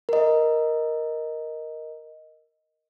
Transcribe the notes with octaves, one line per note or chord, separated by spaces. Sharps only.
A#4 D#5